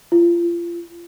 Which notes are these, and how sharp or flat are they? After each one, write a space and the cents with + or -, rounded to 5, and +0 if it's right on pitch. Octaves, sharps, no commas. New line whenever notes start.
F4 -30